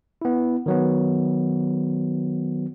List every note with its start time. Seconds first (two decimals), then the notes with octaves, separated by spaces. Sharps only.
0.22 B3 E4
0.66 D#3 F#3 B3